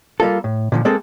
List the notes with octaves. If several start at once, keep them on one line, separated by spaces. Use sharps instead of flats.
G3 A#3 F4 A4
A2
A#2 D3 F3
G#3 A#3 C4 G#4 A4